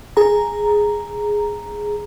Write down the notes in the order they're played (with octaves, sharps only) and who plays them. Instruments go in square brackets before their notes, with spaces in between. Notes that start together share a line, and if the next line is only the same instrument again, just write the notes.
[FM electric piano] G#4 A#5